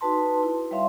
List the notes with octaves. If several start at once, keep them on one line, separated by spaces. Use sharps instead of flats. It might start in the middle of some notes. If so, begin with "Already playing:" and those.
D#4 F#4 B4 A5 C6
E4
G3 C#5 E5 F5 C6